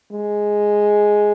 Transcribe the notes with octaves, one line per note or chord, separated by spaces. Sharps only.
G#3